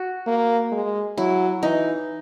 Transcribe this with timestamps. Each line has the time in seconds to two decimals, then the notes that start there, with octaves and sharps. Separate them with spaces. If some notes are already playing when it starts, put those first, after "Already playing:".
Already playing: F#4
0.27 A#3
0.72 G#3
1.18 F#3 E4
1.62 E3 D#4